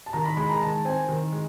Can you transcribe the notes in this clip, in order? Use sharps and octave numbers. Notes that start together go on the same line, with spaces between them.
A5
D#3 A#5
B5
G#3 B5
A#5
D#3 A5
C4 G#5
D#3
G#3